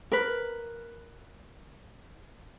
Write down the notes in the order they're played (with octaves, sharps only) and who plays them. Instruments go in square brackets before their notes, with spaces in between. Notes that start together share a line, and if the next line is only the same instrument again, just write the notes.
[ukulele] A#4 B4